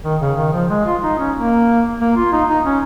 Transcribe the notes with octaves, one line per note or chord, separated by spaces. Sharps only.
D#3
C#3
D#3
F3
G#3
F4
D#4
C#4
A#3
A#3
F4
D#4
D#4
C#4